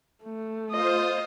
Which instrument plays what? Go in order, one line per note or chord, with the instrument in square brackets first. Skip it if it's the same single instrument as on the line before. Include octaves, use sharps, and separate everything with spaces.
[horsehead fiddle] A3
[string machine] F4 C5 [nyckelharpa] D#5